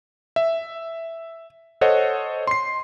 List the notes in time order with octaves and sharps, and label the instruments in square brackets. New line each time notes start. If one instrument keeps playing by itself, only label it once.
[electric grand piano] E5
A4 C5 C#5 D#5 F#5
C6 C7